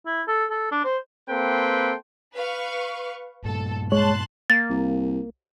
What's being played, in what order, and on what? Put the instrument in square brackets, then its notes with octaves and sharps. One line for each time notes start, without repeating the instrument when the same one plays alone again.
[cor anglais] E4
A4
A4
D4
C5
[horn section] A#3 C4 A4 B4 G5 C6
[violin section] B4 F5 C#6
[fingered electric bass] G2 A#2 [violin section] A4
[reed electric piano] G#3 C#5 [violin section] A5 C6 F#6
[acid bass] A#3 [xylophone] A6
[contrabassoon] C2